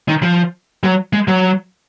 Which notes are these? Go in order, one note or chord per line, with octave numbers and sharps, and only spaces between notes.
D#3
F3
F#3
G#3
F#3